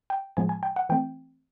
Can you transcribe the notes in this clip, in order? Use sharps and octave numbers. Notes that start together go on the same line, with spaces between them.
G5
A2 F3 G#3 B3 G#5
G#5
G5
F#5
E3 A3 C4 G5